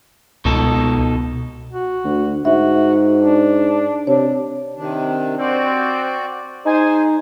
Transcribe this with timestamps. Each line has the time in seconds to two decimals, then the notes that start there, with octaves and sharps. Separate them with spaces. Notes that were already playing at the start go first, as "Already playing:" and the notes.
0.45 C#2 B2 D#4 A4
1.72 F#4
2.04 D2
2.45 G#2 F#4 E5
3.21 D4
4.07 C3 D4 C#5
4.76 C3 D#3 D4
5.38 C4 F#4 D5
6.66 D#4 G#4 C5 G#5